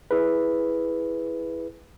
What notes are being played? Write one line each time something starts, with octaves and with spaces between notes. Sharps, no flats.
E4 G#4 B4